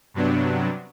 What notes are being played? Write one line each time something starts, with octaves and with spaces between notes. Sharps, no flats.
G2 C3 F#3 B3 D4